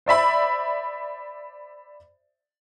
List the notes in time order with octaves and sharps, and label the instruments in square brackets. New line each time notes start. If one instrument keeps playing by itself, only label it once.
[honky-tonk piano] C5 D5 E5 B5